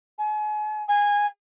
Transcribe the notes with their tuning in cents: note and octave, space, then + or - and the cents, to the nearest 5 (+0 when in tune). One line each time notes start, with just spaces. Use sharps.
G#5 +40
G#5 -15